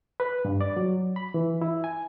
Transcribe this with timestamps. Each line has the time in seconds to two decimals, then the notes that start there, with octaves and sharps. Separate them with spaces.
0.20 B4
0.45 G2
0.61 D5
0.77 F#3
1.16 B5
1.34 E3
1.62 E4
1.84 G#5